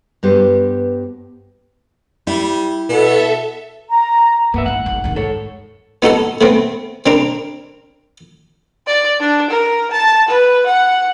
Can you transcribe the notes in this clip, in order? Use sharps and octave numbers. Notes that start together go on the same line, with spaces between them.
G2 B3 G4 C5
G3 E4
B2 B3 A4 E5
A#5
G2 A#3 B3 E5
A1 G#2 F#5
G#1
D1 D#3
G#2 A4 C#5
B3 D#4 F#4 A4 A5
A3 B3 C4
C4 D4 A#4
D5
D4
A#4
A5
B4
F#5